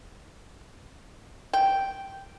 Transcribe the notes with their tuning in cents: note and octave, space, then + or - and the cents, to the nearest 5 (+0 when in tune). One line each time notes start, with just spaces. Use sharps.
G5 -5